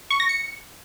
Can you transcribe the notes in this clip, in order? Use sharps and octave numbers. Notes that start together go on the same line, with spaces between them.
C#6
A#6
C#7